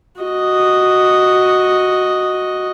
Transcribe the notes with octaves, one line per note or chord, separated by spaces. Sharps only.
F#4 D#5